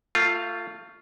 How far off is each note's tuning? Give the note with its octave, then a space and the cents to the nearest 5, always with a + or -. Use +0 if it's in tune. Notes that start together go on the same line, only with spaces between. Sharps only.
A3 +25 F4 +0